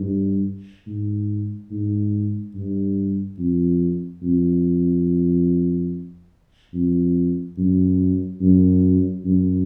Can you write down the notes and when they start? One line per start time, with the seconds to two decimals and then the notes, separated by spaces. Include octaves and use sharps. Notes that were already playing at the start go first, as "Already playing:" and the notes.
Already playing: G2
0.87 G#2
1.71 G#2
2.55 G2
3.39 F2
4.22 F2
6.73 F2
7.57 F#2
8.41 F#2
9.25 F#2